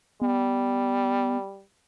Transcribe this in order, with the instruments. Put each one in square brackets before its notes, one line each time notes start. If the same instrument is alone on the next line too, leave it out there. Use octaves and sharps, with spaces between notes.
[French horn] G3 [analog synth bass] B3